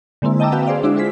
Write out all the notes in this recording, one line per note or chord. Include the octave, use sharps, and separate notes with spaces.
D3 G#3 A#3 C4 E4
D#5 G5 A5 A#5 D6 E6
F#4 B4 F5 G5
G#4 C5 D5 F5
G#3 D4 E4 F#4 D5 E5
F4 G#4 C5 B6